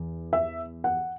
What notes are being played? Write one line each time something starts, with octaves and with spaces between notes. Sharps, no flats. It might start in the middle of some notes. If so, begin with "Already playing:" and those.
Already playing: E2
E5
F#5